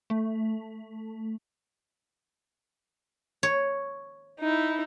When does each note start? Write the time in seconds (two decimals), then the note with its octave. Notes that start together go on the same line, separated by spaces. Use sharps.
0.10 A3
3.43 C#5
4.39 D#4 E4